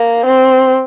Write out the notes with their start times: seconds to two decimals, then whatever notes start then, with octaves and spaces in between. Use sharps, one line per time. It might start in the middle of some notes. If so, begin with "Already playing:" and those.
Already playing: A#3
0.25 C4